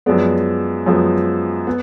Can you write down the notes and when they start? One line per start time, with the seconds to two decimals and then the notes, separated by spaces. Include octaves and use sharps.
0.06 F#2 F3 G#3 B3 D5
0.86 F#2 F3 G#3 B3
1.67 B3